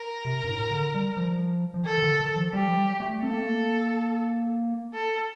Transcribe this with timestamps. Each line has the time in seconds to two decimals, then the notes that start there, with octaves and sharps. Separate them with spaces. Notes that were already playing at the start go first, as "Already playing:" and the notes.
Already playing: A#4
0.25 C3
0.44 G2
0.48 A2
0.71 D3
0.94 G3
1.17 F3
1.74 F3
1.85 D#3 A4
1.98 D#3
2.02 D3
2.20 D#3
2.36 F3
2.53 G3 G4
2.67 F3
2.77 G3
3.00 A3
3.23 C4 A4
3.30 A#3
3.39 A3
3.46 A#3
4.94 A4